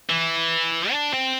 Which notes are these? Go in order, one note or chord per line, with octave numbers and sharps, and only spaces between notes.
E3
D4
C4